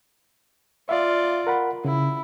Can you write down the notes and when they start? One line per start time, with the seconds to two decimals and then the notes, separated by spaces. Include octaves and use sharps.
0.89 F4 D5 E5 F5
1.47 A#4 F#5 B5
1.85 C#3 E4